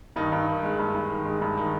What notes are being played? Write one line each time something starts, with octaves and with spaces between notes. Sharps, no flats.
G2 D#3 D#4
G2
D#3
G#3
G2
G2
D#3
G#3
G2
D#3 D#4